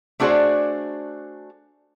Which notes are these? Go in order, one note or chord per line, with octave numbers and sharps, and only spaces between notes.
A3 D4 F#4 G#4 C5 D5